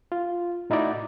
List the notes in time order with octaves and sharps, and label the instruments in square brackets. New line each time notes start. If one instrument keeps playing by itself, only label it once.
[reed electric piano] F4
A2 D#4 E4 F#4 D5